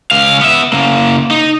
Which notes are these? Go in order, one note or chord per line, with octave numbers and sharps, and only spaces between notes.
C#2 F5
B3 E5
C#3 A#3
D#4